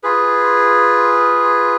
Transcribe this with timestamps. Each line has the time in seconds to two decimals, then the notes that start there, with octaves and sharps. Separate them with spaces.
0.03 F4 G#4 B4